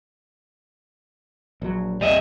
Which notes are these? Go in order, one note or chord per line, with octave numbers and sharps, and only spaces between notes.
A#1 F#3
A#1 F2 G3 D#5 E5